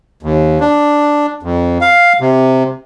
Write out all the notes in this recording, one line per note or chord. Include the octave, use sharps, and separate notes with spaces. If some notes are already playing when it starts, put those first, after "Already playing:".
D#2
D4
F2
F5
C3